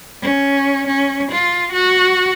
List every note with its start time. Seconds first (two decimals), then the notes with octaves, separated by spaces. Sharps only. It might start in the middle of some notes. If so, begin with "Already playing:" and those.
0.22 C#4
0.87 C#4
1.31 F4
1.73 F#4